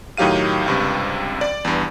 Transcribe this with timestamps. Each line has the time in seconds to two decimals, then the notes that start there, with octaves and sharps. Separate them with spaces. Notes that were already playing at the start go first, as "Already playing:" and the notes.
0.17 A2 D#3 F#3 G4 F5 D#7
0.66 C#2 G2 C3
1.41 D5
1.65 E2 G2